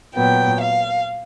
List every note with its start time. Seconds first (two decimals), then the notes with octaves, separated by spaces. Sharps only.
0.15 A#2 F#3 B3 G5
0.60 F5